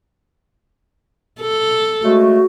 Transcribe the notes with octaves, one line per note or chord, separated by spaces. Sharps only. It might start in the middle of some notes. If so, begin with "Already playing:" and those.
A4
C#3 G#3 A3 F#4